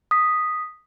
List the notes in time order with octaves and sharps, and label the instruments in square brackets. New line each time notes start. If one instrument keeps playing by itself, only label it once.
[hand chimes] D#6 B6